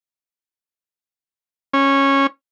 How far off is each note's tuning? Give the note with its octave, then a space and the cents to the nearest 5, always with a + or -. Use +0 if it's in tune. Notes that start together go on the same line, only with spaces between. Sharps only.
C#4 -15